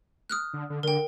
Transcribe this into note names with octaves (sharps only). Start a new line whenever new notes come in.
D#6 F6 F#6
D3
D3
D3 A#4 G5